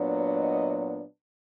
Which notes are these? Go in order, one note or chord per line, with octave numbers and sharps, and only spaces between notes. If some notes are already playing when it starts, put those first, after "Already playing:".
Already playing: A#2 F#3 B3 D4
D#5